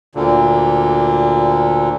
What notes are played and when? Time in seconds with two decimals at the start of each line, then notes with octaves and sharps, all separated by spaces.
0.15 D2 A#2 D3